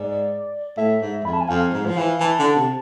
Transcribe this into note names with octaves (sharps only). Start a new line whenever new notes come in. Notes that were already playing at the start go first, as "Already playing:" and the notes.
Already playing: G#2 D5
A2 E5
G#2
F2 B5
A5
G#5
F2 F5
G#2
F3
E3
E3 A5
D3
C3